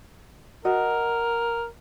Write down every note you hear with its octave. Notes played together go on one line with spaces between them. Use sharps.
F#4 A#4 D#5